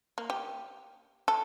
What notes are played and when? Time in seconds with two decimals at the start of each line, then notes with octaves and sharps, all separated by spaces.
0.18 A#3
0.30 G4
1.28 A4